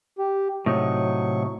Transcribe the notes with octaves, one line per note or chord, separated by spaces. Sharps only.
G4
A2 C3 F#3 D#4 C#6